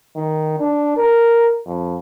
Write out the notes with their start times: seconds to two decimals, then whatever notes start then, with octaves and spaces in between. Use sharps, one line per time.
0.16 D#3
0.59 D4
0.97 A#4
1.66 F2